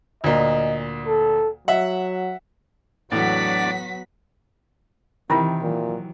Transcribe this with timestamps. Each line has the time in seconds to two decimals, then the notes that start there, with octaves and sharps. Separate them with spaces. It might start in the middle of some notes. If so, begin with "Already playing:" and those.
0.24 D2 A#2 D#5
1.07 A4
1.68 F#3 E5 F#5
3.12 E2 A2 F#3 B3 D4 F#4 D5 B6
5.30 C3 D#3 E3 E4 F4 A#4
5.62 A#2 E3 F#3